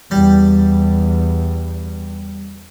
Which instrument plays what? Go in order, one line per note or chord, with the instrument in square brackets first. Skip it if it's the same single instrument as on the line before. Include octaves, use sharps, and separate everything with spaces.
[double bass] E2 [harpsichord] G3